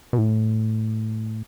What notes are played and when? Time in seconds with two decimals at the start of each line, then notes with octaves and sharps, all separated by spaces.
0.13 B2
0.18 A2